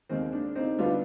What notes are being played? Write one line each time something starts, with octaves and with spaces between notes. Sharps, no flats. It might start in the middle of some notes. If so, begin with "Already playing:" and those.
D#2 D#3 G#3 C4
D4
C4 D#4
D2 D3 G3 B3 D4 F4